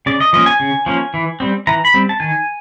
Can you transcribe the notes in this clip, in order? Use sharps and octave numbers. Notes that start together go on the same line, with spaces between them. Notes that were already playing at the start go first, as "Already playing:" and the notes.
C#3 D5
D#5
F3 A#3 C#4 D#5
G#5
C#3
F3 A#3 C#4
E3
G3 C4
E3 A#5
B5
G3 C4
A5
D#3 G#5